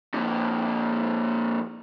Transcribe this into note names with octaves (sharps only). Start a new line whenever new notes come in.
F2 A#2